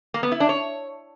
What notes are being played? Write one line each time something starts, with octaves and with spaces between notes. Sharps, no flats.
A#3
B3
E4
D4
C#5